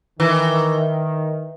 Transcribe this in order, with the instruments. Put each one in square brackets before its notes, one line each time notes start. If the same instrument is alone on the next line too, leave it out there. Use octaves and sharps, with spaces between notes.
[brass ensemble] D#3 [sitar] E3